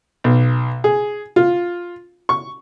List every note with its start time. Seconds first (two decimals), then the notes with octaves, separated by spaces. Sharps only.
0.24 B1
0.84 G#4
1.36 F4
2.29 C#6